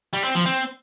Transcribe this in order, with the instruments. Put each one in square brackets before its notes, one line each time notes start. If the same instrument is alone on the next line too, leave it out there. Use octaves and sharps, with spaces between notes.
[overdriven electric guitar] G3
C4
F3
C4